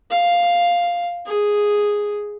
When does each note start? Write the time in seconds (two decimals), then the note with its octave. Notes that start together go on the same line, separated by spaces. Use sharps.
0.10 F5
1.26 G#4